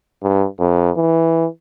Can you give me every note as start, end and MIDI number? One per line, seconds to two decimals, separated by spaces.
0.23 0.46 43
0.59 0.91 41
0.97 1.47 52